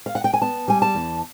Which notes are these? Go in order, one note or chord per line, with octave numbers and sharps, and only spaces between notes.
F5
F#5
G5
G#5
B3 A5
G3 G#5
A5
E2